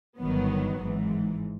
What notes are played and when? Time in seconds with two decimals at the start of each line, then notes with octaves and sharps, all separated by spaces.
0.19 G1 G2 D#3 F#3 B3
0.78 G#1 G#2 E3